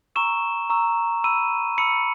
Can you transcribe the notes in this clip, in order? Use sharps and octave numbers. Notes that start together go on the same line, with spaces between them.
A#5 C#6 E6 E7
A#5 C#6 E6
B5 E6 D#7
B5 E6 C#7